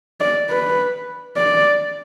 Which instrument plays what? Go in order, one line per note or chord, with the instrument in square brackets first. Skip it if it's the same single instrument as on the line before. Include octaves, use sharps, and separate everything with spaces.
[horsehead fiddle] D5
B4
D5